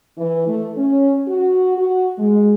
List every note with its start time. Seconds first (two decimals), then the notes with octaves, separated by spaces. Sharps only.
0.17 E3
0.47 A3
0.76 C#4
1.27 F#4
1.77 F#4
2.19 G#3